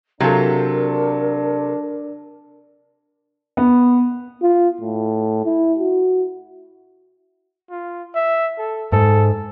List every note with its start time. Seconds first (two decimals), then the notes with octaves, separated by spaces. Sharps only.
0.20 C3 F#3 D4 F4 A4 A#4
3.57 B3
4.42 F4
4.81 A2
5.45 E4
5.79 F#4
7.70 F4
8.15 E5
8.59 A4
8.92 G#2 A4